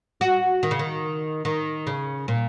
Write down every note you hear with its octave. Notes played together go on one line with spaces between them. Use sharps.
F#4
D#3
C#3
D#3
D#3
C#3
A#2